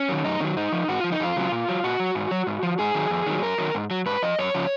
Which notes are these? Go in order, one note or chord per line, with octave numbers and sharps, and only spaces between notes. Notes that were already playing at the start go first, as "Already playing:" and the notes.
Already playing: C#4
D#3 F#3
F#2 D#4
D#3 F#3 C#4
G#2 D#4
F3
G#2 F#4
F3 F4
D#4
F2 F4
C#3 F#3
A#2
F#3
A#2 F#4
F#3
G#2
F#3
G#2
F3
G#2 G#4
D#3 F#3
F2
D#3 F#3
F#2 A#4
D#3 F#3
G#2
F#3
G#2 B4
F3 D#5
F#2 C#5
C#3 F3